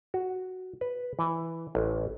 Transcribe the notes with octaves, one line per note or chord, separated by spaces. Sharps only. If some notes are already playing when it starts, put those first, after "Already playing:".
F#4
B4
E3
A1